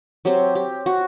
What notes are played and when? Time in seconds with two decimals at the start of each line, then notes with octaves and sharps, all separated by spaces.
0.25 F#3 C4 G4
0.55 G4
0.86 F#4